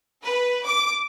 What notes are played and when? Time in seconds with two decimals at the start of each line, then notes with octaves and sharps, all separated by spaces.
0.23 B4
0.65 D6